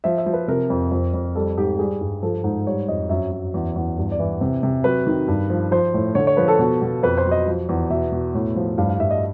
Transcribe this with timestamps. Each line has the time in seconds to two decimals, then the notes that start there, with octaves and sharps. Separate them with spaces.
0.04 F3 E5
0.18 E5
0.26 F3
0.33 B4
0.48 C3 A#4
0.70 F2
0.92 F2
1.14 F2
1.35 G3 A4
1.57 G#2 G4
1.79 G3 G#4
2.01 G2
2.22 F3 A4
2.44 G#2
2.67 G3 C#5
2.88 F2 D#5
3.09 F#2 E5
3.31 F#2
3.54 E2
3.76 E2
3.98 G2
4.12 D5
4.19 E3
4.41 C3
4.63 C3
4.84 F#3 B4
5.06 D#3
5.28 G2
5.50 F3
5.71 F3 C5
5.94 A2
6.15 D3 C#5
6.27 C#5
6.37 F3 B4
6.48 A4
6.59 B2
6.82 B2
7.03 F2 B4
7.17 C5
7.25 F#3
7.31 D#5
7.46 F3
7.69 E2
7.90 B2 E5
8.12 B2
8.34 A2
8.56 F3
8.78 G2 F5
8.89 F5
8.99 G2 E5
9.10 D#5